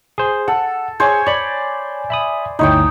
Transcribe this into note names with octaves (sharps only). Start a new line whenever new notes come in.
G#4 C5
A4 F#5
G#4 C5 C#5 G#5
C#5 D5 B5
E5 B5 D#6
G1 D2 D#4 E4 C#5 G5